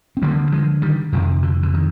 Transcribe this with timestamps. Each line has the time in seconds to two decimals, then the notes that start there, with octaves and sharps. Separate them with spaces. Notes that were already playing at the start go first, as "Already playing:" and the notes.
0.17 C4
0.22 D2 D3 G3 A#3
0.52 F3 G#3
0.82 D#3 G3
1.12 F2 C3 D#3
1.43 D3
1.63 D3
1.74 D#3